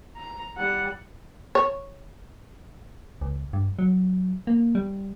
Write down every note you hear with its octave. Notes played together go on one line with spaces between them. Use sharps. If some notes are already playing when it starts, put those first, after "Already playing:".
A#5
G3 F#5
C#5
C#2
G2
F#3
A#3
G3